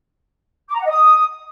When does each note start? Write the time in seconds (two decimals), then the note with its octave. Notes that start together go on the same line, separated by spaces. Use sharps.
0.68 D6
0.74 A#5
0.79 F#5
0.84 D#5
0.90 D#6